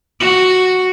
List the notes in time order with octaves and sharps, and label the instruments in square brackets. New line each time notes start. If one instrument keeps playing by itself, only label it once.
[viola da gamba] F#4